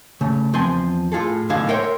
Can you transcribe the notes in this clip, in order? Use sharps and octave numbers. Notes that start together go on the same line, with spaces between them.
C#3 A3
E2 F3 C4 G#5 C6
A2 F4 G#4 A4
B1 A2 D3 F5 G#5
A#4 C5 C#5 E5 F#5 G5